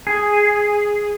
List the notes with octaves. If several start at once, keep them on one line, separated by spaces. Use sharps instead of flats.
G#4